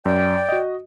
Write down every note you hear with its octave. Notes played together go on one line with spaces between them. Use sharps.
F#2 D5 G5
F#4 D#5